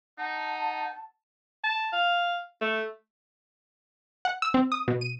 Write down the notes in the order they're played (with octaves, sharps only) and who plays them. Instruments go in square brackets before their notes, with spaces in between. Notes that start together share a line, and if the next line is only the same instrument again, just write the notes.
[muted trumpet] D#4 [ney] F#5 [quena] A5
[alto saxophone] A5
F5
A3
[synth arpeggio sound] F#5
E6
C4
D#6
B2
D#7